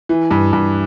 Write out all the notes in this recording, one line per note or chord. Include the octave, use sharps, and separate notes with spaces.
E3
G2
G2